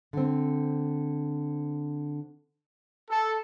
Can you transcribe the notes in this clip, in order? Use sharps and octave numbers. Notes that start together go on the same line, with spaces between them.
D3 C4
A4